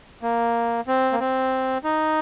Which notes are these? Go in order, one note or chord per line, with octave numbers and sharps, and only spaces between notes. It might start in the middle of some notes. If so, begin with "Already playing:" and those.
A#3
C4
A#3
C4
D#4